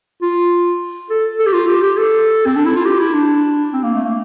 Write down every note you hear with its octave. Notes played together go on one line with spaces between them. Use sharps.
F4
A4
A4
G4
F4
G4
G4
A4
C4
D4
E4
F4
G4
E4
D4
C4
A#3
A3
A#3